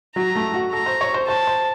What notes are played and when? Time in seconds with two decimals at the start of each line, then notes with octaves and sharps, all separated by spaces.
0.16 F#3 A#5
0.35 A3
0.54 F#4
0.72 A4 A#5
0.86 C5
1.01 C#5
1.14 C5
1.28 C5 A5
1.47 C5